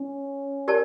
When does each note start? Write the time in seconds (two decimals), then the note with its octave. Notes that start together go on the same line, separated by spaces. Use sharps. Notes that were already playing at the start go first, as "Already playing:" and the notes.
Already playing: C#4
0.68 G4 A#4 D5 A5